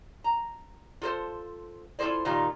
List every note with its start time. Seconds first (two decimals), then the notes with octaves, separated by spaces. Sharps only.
0.24 A#5
1.02 F4 A4 C5
1.99 E4 F4 G#4 A4 C5 D5
2.25 A#2 D#3 G3 D#4 F4